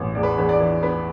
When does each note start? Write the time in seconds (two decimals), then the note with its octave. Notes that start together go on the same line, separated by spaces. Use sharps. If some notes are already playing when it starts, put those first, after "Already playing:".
Already playing: A1 B3
0.15 E2 D5
0.23 B4
0.37 E2 B4
0.49 D5
0.60 E3
0.83 B3 B4